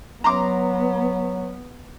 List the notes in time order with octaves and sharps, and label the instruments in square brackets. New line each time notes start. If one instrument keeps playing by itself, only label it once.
[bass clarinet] F#3 [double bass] B3 [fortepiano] A#5 C6 D6